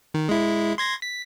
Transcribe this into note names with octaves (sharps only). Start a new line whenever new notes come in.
D#3
G#3 E4
C6 G#6 A#6
B6